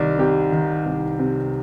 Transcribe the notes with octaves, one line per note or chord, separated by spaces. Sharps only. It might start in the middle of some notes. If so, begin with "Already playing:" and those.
Already playing: C2 D#3 D5
C3 G4
D#3
C2
C3